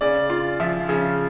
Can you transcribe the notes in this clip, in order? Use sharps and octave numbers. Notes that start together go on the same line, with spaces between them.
C#3 D5
F4
F3 E5
C#3